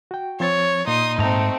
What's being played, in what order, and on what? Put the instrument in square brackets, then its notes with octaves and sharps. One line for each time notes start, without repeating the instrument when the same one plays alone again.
[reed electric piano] F#4 G5
[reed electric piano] F3 C4 A6 [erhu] C#5
[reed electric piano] A#2 A#3 [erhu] D#4 [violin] C6 D#6
[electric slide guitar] G#2 A#5 [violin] A3 C4